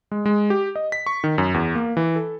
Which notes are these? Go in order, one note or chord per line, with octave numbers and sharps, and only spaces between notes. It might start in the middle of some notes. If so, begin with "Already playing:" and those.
G#3
G#3
G4
D#5
B6
C#6
D#3
F#2
E2
A#3
E3
A4